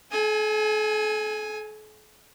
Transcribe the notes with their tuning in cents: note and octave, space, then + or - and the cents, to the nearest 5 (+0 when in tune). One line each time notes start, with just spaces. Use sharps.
A4 -45 G#5 +0